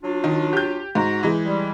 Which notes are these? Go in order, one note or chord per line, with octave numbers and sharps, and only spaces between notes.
F#3 D4 F4
D#3
G4 G6
G#2 F#4 A#5
E3 G#3
G3